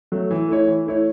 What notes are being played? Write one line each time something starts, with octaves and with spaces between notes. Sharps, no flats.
F#3 A3
E3
A3 E4 C#5
E3
A3 E4 C#5